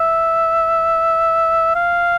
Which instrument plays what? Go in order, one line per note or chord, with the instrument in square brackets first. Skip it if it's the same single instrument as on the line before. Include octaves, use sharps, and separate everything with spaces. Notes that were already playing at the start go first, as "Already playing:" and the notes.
Already playing: [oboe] E5
F5